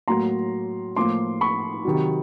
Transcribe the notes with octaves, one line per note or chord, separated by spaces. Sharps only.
A2 F#3 A#3 A#5 C6
A2 F3 A#3 C6 D6
B5 C#6
C3 D#3 F#3